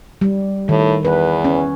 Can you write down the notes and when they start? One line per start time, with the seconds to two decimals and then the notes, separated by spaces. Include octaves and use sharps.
0.21 G3
0.69 A2 D#3
1.05 E2 B4
1.45 C#4